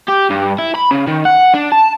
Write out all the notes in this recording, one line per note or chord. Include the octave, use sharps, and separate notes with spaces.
G4
G2
E4
B5
C#3
D#3
F#5
D4
A5